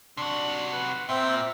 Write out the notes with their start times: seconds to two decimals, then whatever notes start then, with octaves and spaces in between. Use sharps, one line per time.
0.17 C3 D4 F#4
0.72 B4
1.09 A#2 C4 E5 G5